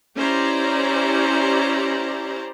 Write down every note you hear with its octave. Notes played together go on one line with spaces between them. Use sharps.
C#4 E4 G4 C5 D5 A#5